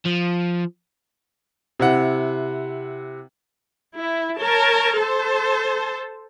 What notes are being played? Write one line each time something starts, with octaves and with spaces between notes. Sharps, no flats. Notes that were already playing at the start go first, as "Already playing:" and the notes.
F3
C3 E4 F#5
E4
A#4 C#5 A5
A4 C5 A5